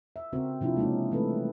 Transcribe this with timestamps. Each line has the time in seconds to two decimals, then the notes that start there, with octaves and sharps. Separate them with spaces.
0.16 E5
0.32 C#3 C4 F#4 A#4
0.61 C3 F3 D4 E4 F4
0.76 G#3 A#3 C#4 D#4
1.11 E3 G3 A3 C4 A4 B4